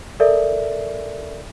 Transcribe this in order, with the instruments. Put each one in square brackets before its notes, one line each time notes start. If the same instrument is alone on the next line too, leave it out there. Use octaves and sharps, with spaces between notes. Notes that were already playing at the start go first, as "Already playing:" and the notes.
[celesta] A4 A#4 D5 E5